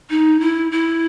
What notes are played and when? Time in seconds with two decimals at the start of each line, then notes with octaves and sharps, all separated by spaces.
0.09 D#4
0.40 E4
0.71 E4